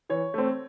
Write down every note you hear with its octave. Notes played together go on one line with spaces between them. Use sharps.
E3 C#5
A3 C4